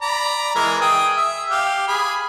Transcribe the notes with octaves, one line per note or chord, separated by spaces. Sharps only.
D5 A#5 B5
E3 G#3 A#4
G#4 G5 D#6
E5
G4 F5
G#4 B5